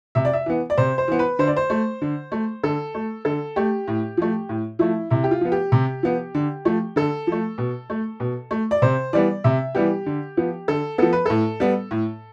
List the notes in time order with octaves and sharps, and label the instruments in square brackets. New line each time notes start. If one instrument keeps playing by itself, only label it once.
[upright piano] C3 E5
D5
E5
E3 B3
D5
C3 C5
C5
E3 B3
B4
D3 C5
D5
C5
A3
D3
A3
D3 A4
A3
D3 A4
A3 G4
A2
F3 A3
A2
F3 A3 E4
C3 E4
G4
F4
F3 B3
G4
C3
F3 B3
D3
F3 A3
D3 A4
F3 A3
B2
A3
B2
A3
D5
C3 C5
E3 G3 B3 D5
C3 E5
E3 G3 B3 G4
D3
F3 B3
D3 A4
F3 B3 A4
B4
A2 A4
G3 B3
A2